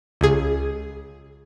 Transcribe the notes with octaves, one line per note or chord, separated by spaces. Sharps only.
C#2 G#4